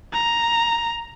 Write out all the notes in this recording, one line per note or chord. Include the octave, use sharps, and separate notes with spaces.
A#5